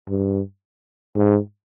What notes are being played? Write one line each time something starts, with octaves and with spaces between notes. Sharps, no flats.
G2
G#2